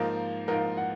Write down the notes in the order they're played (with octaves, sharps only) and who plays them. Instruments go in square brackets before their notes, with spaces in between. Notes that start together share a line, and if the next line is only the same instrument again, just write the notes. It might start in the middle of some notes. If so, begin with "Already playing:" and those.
Already playing: [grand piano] G#2 F3 A#3 D#4 [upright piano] A#4
[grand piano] G#2 F3 A#3 D#4 [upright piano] A#4
[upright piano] F#5